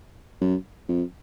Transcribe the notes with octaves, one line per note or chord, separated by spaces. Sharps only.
F#2
F2